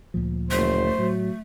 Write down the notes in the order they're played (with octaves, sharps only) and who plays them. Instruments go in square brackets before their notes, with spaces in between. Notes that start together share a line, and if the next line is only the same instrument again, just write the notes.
[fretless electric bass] D2 A#2 F3
[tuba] F#1 [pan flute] A3 [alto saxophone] C5
[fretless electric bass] A2 [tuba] F#3